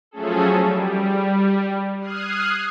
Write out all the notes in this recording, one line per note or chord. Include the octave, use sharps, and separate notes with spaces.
F3 F#3 A3 C#4 G#4 A4
G3
D#6 F6 F#6 G#6 C7 D#7